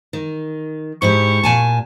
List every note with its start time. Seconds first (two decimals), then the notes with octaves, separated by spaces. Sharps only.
0.13 D#3
1.02 G#2 E4 G4 C#6
1.43 A#2 G#5 A5